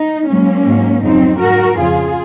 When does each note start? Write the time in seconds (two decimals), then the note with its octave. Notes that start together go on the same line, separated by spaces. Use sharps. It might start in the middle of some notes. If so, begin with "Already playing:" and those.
Already playing: D#4
0.28 G#2 F#3 A#3 C#4
0.66 G#2 F#3
1.02 F2 C#3 F#3 C4 D#4
1.40 G#2 F#3 F#4 A#4
1.78 F2 C#3 F3 F4 G#4